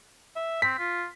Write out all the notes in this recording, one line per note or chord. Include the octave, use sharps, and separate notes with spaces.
E5
C4 B6
F4